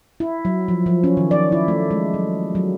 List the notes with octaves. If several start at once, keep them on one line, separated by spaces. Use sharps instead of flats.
E4
F#3
F3
F3
C#4
D#3
D5
E4
A3
G#3
F#3
F#3